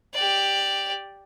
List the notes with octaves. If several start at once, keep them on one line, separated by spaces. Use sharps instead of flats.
G4 D5